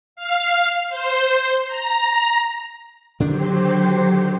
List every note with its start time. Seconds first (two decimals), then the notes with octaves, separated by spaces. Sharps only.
0.16 F5
0.89 C5
1.68 A#5
3.20 D3 D#3 F#3 D4 G4 C5